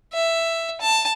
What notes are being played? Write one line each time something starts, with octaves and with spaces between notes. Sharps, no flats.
E5
A5